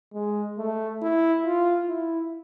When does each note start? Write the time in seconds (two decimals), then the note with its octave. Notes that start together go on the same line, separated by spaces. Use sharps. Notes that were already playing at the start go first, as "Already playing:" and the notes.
0.14 G#3
0.58 A3
1.02 E4
1.46 F4
1.89 E4